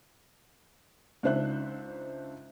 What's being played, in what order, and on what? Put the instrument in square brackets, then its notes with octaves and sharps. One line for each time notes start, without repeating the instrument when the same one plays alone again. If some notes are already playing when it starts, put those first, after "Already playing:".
[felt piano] C#2 D4 D#4 C5 E5 F#6